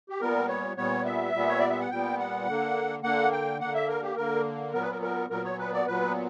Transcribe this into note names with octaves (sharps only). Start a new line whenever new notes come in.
G4
A#2 G3 B3 A#4
C#5
A#2 G3 B3 C#5
E5
A#2 G3 B3
C#5
D5
E5
F#5
A#2 G3 B3 G5
F#5
D3 A#3
D3 A#3 F#5
G5
D3 A#3 F#5
E5
A#4
G4
D3 A#3 A#4
A#2 F#3 B3 A#4
B4
A#4
A#4
A#2 F#3 B3 A#4
C#5
B4
D5
A#2 F#3 B3 B4